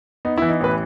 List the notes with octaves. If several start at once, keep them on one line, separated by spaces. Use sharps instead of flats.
B3 D#4
E3 E4
D#4
A1 B4